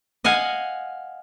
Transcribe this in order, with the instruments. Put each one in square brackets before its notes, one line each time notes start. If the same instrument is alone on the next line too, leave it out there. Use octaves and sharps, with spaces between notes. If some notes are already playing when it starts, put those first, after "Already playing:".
[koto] D#5 F5 F#5 G#5